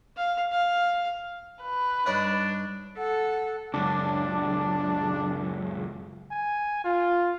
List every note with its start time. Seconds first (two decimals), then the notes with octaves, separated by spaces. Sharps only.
0.17 F5
0.52 F5
1.62 B4
2.06 G2 D4 D#4 C#5
2.98 A4 F#5
3.74 C#2 F#2 D4
6.31 G#5
6.84 F4